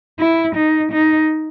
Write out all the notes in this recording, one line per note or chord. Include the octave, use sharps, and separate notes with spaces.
E4
D#4
D#4